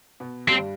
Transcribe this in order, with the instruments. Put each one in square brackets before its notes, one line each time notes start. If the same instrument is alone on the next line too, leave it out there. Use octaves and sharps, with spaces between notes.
[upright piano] B2 B3
[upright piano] G2 G3 [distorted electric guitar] C4